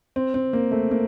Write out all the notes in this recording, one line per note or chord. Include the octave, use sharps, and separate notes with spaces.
C4
C4
A#3
A3
A#3